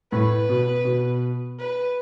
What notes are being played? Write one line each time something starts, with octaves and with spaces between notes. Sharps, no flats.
A2 B4
B2
B2
B4